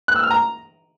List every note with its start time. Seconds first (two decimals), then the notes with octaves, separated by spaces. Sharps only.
0.08 F#6
0.16 E6
0.23 F6
0.31 A#5